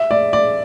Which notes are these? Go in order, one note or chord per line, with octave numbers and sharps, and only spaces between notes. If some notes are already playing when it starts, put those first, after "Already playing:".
Already playing: E5
D5
D5